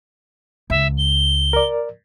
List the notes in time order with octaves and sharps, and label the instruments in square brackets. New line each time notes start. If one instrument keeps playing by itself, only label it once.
[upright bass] C#2 [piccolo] E5
[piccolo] G7
[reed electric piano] A#4 D5